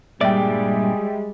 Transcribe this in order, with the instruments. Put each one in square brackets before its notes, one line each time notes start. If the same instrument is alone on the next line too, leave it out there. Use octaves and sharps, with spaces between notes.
[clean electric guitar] G2 A#2 D5 [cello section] G3 [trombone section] G#3 G#4 [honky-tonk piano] E5 G5